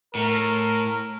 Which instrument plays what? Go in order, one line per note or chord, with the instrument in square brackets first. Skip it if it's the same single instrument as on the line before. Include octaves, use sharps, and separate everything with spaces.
[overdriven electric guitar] A2 [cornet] A#4